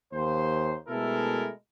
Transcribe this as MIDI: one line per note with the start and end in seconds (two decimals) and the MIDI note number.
0.13 0.76 39
0.13 0.76 72
0.88 1.50 47
0.88 1.50 56
0.88 1.50 57
0.88 1.50 64
0.88 1.50 69
0.88 1.50 70